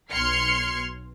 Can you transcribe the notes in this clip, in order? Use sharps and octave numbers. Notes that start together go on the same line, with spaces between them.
B1 C6 F6 G#6 C7 C#7